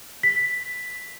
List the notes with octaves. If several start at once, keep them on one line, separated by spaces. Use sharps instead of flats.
B6